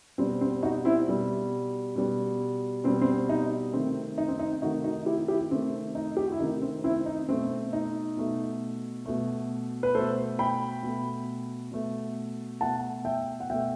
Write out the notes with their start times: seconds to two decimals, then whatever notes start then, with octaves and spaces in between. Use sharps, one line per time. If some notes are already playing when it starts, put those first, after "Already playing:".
0.18 B2 G3 C4
0.41 C4
0.63 D#4 F#4
0.85 C4 E4
1.07 B2 G3
1.96 B2 G3
2.84 B2 G3 C4
3.01 C4
3.29 D#4
3.73 C3 D#3 A3 C4
4.18 D#4
4.28 C4
4.39 D#4
4.62 C3 D#3 A3 D#4 F#4
4.84 D#4 F#4
5.06 E4 G4
5.28 E4 G4
5.50 C3 D#3 A3 C4
5.95 D#4
6.17 G4
6.24 F#4
6.32 E4
6.40 C3 D#3 A3 D#4
6.62 C4
6.84 C4 E4
7.06 D#4
7.28 B2 A3 C4
7.73 D#4
8.17 B2 A3
9.06 B2 A3
9.83 B4
9.94 B2 A3 A4 C5
10.39 G5 B5
10.83 B2 A3
11.72 B2 A3
12.61 B2 A3 F#5 A5
13.05 E5 G5
13.40 F#5
13.50 B2 A3 E5 G5